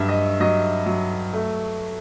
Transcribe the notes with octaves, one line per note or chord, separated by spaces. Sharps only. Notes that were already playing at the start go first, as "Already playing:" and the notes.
Already playing: G2 F#3 E5
D#5
F#3 D#5
F#3
A3